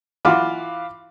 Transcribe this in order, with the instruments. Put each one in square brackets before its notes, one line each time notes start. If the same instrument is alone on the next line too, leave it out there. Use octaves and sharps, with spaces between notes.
[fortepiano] E3 F4 F#4 [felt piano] F5 B5 D6